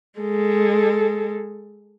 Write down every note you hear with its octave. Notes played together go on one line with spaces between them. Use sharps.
G#3 A4